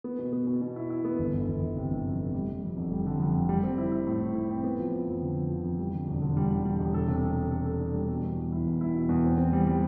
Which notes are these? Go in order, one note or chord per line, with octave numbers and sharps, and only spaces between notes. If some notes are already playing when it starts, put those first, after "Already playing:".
B3
B2
B3
B2
B2
E4
E4
B3
G1
G1
G1
G1
C3
G1
F2
C3
G3
G3
F2
F1
G3
D3
F2
F2
G3
C4
E4
E4
A2
A2
E4
C4
B3
F3
F3
F2
D3
F2
F3
F2
G3
D3
E1
D3
G3
G3
G3
E1
A4
C3
A4
A4
A4
A4
D4
G3
B2
E2
E2
E4
E2
E4
B2
E2
C4
C4
G3
G3